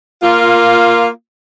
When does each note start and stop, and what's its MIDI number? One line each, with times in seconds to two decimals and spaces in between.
0.22 1.08 58
0.22 1.08 65